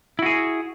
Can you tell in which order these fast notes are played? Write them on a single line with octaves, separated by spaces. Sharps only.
E4 F#4 G#4